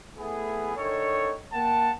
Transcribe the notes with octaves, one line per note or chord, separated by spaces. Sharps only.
A3 B3 E4 G#4
D3 D#3 A4 C#5
A#3 F#5 G5 A5